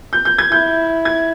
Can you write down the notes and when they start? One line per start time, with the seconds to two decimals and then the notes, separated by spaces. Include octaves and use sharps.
0.13 G6
0.25 G6
0.38 G#6
0.52 E4 G6
1.05 G#6